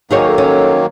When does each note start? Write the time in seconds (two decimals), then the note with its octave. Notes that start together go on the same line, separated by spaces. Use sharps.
0.11 D#3 F#3 A#3 D#4 G#4 C#5
0.26 A4
0.38 C#4